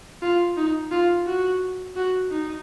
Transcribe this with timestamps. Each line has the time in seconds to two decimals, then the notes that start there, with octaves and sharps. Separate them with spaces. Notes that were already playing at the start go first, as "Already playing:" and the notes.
0.22 F4
0.57 D#4
0.91 F4
1.26 F#4
1.96 F#4
2.31 D#4